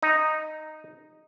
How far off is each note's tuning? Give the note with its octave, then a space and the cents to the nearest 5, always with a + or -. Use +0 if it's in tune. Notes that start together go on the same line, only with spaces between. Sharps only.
D#4 -5